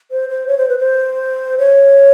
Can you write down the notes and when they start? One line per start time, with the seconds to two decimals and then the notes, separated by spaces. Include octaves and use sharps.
0.11 C5
0.29 C5
0.47 C#5
0.58 C5
0.69 B4
0.79 C5
1.58 C#5